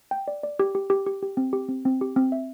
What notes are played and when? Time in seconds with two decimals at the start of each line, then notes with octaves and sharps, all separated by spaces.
0.11 G5
0.28 D5
0.43 D5
0.59 G4
0.75 G4
0.90 G4
1.06 G4
1.23 G4
1.37 C4
1.53 G4
1.69 C4
1.85 C4
2.01 G4
2.16 C4
2.32 E5